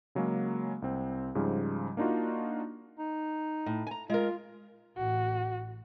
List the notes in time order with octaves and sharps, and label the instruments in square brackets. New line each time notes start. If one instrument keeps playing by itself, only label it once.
[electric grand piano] C#3 F#3 G#3 A#3 C#4
C2 C4
G#2 C#3 F3 G3
A#3 D4 D#4 F4 F#4
[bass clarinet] D#4
[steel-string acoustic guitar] A2
G#5 A#5
[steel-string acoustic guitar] G#3 A#4 [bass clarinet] F4
[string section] A1 [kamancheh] F#4